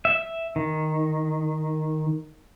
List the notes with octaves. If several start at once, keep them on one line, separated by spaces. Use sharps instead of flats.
E5
D#3